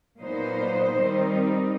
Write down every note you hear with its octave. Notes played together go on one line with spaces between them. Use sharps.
A#2 F#3 B3 D#4 C5
D#3 G3 C4 D#4